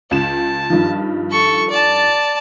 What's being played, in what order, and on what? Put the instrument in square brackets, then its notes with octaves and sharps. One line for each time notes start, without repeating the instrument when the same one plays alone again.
[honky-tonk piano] C#2 E7 [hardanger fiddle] A5
[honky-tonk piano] G2 D#3 F3
[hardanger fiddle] A4 C#6
D5 A5